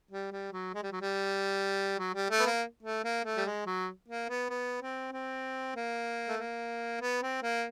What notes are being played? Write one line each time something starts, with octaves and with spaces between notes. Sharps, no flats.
G3
G3
F#3
G#3
G3
F#3
G3
F#3
G3
A3
B3
A#3
A3
A#3
A3
G3
G#3
F#3
A#3
B3
B3
C4
C4
A#3
A3
A#3
B3
C4
A#3